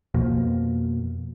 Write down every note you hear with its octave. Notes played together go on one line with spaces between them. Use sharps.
F2 B2 F3 A#3